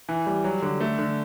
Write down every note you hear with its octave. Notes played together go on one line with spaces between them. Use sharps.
E3
G3
F#3
D3
A3
D3